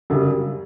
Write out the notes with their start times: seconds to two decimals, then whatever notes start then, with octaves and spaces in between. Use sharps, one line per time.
0.10 F#2 C#3 G3